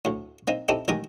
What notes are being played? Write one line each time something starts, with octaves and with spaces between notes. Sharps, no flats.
D2 A2
A#3 C4 D#4
C4 D#4 E4 G4 A4
A1 D#3 G#3 A#4 D6 D#6